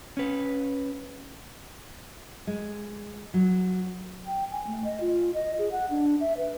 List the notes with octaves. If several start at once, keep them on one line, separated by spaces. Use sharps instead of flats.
C#4 B4
G#3
F#3
G5
G#5
A3
D#5
F4
D#5
G#4
F#5
D4
E5
B4